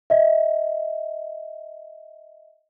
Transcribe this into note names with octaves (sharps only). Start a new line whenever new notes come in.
D#5 E5